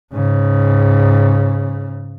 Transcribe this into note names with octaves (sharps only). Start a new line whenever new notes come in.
G#2 C#3